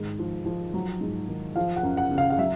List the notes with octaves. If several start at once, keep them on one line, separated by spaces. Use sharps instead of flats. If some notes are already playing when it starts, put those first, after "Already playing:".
Already playing: G#2 D#3
F3
F3
F#3
G#2
D#3
F3 F5
F#5
F#2
F#5
C#3
F5
F5
F#3 E5